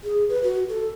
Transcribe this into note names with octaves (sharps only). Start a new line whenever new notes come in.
G#4
B4
F#4
A4